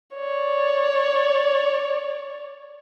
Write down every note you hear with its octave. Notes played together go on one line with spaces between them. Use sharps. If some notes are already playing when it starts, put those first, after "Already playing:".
C#5 D5